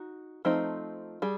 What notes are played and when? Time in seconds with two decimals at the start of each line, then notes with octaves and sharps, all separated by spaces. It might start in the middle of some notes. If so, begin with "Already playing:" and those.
Already playing: D#4 F#4
0.45 F3 A3 C4 D#4
1.22 G3 G#4